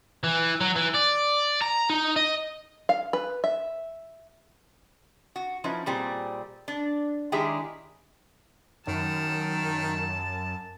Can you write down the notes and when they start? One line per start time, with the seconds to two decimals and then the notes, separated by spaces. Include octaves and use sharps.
0.23 E3
0.61 F#3
0.76 E3
0.94 D5
1.61 A#5
1.90 D#4
2.16 D#5
2.89 F5
3.13 B4
3.44 E5
5.36 F#4
5.64 F3 C#4 D#4 E4 B4
5.86 A#2 G3 C4 G#4
6.68 D4
7.32 D#3 G#3 D4 E4 G4 G#4
8.87 F#2 D#3 A5